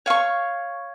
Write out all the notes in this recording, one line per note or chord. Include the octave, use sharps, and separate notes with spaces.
C#5 F5 C#6